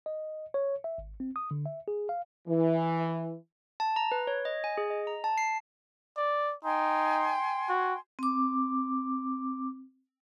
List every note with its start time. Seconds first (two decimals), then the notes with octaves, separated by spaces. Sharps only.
0.06 D#5
0.54 C#5
0.84 E5
0.98 G#1
1.20 C4
1.36 D#6
1.51 D3
1.66 E5
1.88 G#4
2.09 F5
2.48 E3
3.80 A5
3.96 A#5
4.12 B4
4.27 C#5
4.45 D#5
4.64 G#5
4.78 G#4
4.90 D#5
5.07 A#5
5.24 A5
5.38 C7
6.17 D5
6.64 D#4 G5 G#5 C6
7.69 F#4
8.19 C4 D6